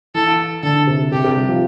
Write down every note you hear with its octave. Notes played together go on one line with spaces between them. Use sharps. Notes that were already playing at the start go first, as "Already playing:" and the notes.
E3 A4
D3 A4
C3
C3 G4
C3
G3
F3